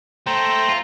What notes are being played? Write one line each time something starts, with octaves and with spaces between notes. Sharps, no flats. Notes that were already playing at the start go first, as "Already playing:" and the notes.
A3 A4 C5 G5 A#5
F4